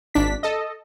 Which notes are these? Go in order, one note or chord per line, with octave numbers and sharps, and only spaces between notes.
G#1 D4 B6
A4 D#5